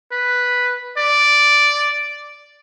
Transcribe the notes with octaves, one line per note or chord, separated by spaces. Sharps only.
B4
D5